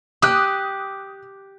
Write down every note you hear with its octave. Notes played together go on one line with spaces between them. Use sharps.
G4 D#6 F#6